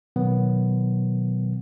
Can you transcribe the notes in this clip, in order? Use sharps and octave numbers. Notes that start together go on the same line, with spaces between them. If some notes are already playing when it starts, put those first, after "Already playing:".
B2 D#3 F#3 B3